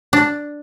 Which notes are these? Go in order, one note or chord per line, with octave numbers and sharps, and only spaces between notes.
D4